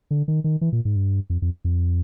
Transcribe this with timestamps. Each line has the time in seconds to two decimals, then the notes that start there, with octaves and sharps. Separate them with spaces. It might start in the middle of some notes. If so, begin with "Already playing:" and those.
0.11 D3
0.28 D#3
0.44 D#3
0.61 E3
0.73 A#2
0.85 G#2
0.96 G2
1.30 F2
1.42 F2
1.64 F2